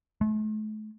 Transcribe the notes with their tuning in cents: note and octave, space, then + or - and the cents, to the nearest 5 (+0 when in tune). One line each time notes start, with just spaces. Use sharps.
A3 -40